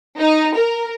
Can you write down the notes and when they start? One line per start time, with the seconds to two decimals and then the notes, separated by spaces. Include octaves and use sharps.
0.18 D#4
0.55 A#4